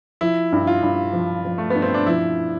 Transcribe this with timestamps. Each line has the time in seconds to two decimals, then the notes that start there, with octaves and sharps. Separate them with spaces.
0.21 F3 E4
0.52 G2
0.67 F4
0.82 G2
1.13 F3
1.45 F3
1.58 A3
1.70 G2 B3
1.82 C4
1.94 D4
2.06 F3 E4